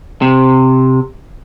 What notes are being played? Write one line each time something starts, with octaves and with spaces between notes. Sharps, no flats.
C3